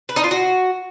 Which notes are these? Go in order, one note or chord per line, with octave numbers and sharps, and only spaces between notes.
B4
D#4
F4
F#4